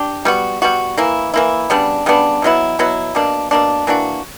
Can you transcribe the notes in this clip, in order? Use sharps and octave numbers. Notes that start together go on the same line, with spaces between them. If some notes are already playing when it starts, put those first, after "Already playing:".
Already playing: D4 G4
G3 B3 F#4
G3 B3 F#4
E3 A#3 E4
E3 A#3 E4
C#3 G3 B3 D4
C#3 G3 B3 D4
B2 F#3 B3 E4
B2 F#3 B3 E4
B2 A#3 D4
B2 A#3 D4
E3 A#3 D4 F#4